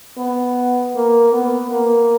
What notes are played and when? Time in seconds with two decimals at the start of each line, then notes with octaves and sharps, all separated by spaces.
0.18 B3
0.96 A#3
1.33 B3
1.71 A#3